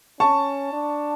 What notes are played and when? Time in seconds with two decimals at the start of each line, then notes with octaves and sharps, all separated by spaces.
0.20 C#4 A5 C#6
0.73 D4